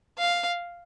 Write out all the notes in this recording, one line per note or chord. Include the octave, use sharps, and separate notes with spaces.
F5